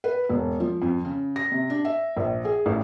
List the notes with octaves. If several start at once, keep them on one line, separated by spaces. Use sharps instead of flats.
B4
E1
F3
F2
C#3
A#6
C3
D4
E5
A#1
G#4
A1